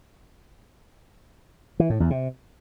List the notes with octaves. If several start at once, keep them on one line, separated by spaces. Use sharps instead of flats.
E3
A2
E2
C3